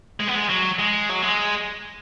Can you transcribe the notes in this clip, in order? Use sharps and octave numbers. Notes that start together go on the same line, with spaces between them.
G#3
B3
G#3
F#3
G#3
F#3
G#3